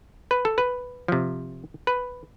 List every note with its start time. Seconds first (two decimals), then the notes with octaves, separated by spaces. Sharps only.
0.31 B4
0.45 A4
0.58 B4
1.08 C3 F3
1.87 B4